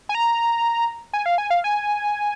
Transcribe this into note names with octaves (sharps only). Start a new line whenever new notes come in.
G#5
A#5
G#5
F5
G#5
F5
G#5